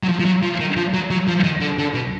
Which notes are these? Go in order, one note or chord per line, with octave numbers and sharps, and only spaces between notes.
F#3
F3
F3
F#3
F3
D#3
F3
F#3
F#3
F3
D#3
D3
D3
B2